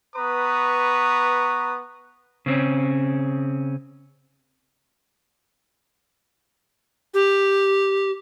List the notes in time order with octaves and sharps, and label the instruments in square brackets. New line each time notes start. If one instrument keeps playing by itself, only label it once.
[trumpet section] B3 B4 A#5 C#6 D#6
[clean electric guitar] C#3 C4 C#4
[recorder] G4